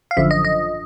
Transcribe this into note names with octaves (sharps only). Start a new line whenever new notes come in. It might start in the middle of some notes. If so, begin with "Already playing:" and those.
F5
G#1 F#2 D3 F3 E5
D#5
D#5